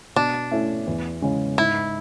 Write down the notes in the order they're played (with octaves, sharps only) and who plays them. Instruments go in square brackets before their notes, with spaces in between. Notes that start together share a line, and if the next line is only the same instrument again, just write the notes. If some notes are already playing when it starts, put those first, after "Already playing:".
[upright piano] B2 [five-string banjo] D4
[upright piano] A3 C#4 E4
E2
C#3 G#3 C#4 E4
[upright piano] G#2 [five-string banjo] E4